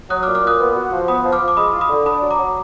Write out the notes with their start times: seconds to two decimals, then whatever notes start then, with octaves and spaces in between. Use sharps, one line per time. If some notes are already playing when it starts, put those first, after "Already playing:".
0.10 F#3 D#6 F#6
0.23 D6 F6
0.27 A#2
0.35 D6 F6
0.43 A#2 D#6 F#6
0.60 B3
0.76 F#4
0.92 F3
1.08 B3 B5 D#6
1.24 F3
1.32 D6 F6
1.41 F3
1.48 D6
1.57 G#3 B5 D#6
1.73 F4
1.81 B5 D#6
1.90 D3
2.06 D4 B5 D#6
2.22 F#3
2.30 A#5 D6
2.38 F#3